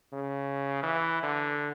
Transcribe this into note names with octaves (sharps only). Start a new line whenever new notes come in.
C#3
E3
D3